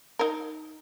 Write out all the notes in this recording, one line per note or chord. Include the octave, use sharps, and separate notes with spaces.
D#4 A#4